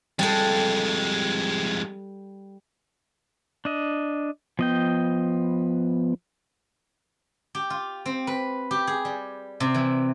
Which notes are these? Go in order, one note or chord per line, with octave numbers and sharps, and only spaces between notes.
F2 G3 G#3 A4
D4 D#5
F3 B3 D#5 G5
G4
F4
C4
B4
G4
G#4
G3
C3
E3